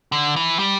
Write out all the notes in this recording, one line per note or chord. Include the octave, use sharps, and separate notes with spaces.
D3
E3
G3